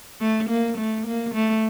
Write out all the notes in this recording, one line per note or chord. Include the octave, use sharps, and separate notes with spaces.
A3
A#3
A3
A#3
A3